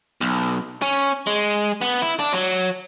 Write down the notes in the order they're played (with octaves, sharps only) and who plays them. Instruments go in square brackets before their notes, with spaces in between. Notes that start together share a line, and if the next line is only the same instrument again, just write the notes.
[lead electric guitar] B1
C#4
G#3
B3
E4
D4
F#3